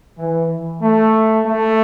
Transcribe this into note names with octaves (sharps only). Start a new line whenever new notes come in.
E3
A3
A3